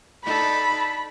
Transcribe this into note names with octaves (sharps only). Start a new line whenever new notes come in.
D4 D#4 A4 B5